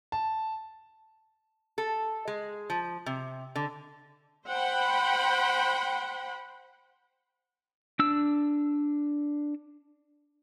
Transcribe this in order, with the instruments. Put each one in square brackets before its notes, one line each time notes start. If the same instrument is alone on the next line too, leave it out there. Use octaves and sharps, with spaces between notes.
[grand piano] A5
[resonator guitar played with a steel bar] A4
G#3
F3
C3
D3
[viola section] C5 F#5 G5 B5
[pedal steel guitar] D4 E6